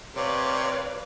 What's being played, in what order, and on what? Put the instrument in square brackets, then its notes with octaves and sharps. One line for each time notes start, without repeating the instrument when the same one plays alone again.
[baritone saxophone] C3 [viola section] B4 D5 F5 [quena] C#5